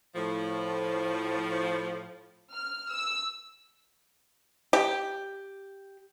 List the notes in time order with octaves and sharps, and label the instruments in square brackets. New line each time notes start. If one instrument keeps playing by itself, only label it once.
[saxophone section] A2 F3
[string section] F6
E6
[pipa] G4